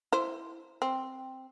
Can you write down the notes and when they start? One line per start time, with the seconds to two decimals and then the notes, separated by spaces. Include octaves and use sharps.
0.12 E4 C5
0.82 C4